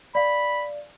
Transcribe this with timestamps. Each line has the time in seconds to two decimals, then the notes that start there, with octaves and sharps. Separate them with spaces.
0.15 D5 F5 B5